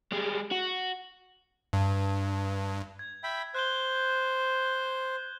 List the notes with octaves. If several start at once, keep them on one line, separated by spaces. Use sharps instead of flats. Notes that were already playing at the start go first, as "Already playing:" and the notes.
G3 G#3
F#4
G2
G#6
E5 G5 B5
C5 F#6 G6 G7